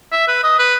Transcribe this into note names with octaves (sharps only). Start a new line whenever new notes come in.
E5
B4
D#5
B4